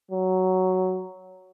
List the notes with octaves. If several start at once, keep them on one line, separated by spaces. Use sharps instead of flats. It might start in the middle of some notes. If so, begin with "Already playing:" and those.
F#3